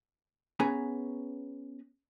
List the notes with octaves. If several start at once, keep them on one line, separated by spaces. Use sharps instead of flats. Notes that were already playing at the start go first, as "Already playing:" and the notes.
B3 C#4 G#4 B4 G#5 A#5